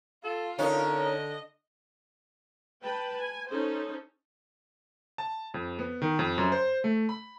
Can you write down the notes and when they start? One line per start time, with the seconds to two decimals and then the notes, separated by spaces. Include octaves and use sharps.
0.24 F4 A4
0.58 D3 C#4 D#4 A#4
0.99 D#5
2.81 B4 G5 A5 B5
3.17 G#5
3.49 C#4 D#4 A4 C5
5.18 A5
5.54 F2
5.79 B3
6.02 D#3
6.19 F2
6.38 F#2
6.52 C5
6.84 A3
7.09 B5